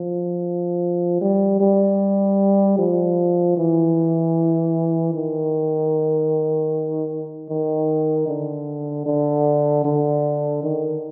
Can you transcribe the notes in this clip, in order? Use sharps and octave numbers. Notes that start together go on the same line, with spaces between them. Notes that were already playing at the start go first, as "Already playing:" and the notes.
Already playing: F3
G3
G3
F3
E3
D#3
D#3
D3
D3
D3
D#3